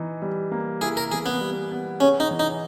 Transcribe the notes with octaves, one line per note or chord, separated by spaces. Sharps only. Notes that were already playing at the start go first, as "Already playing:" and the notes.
Already playing: E3 D#4
G3
A#3
E4 G#4
A#4
E3 G#4
B3
G3
B3
C#4 G#4
D#4
E3
D#4